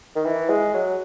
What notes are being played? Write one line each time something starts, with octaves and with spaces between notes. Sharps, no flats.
D#3
E3
G#3
F#3